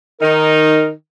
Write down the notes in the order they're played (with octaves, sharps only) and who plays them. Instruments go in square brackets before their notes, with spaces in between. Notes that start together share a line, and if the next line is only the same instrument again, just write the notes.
[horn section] D#3 D#4 [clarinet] A#4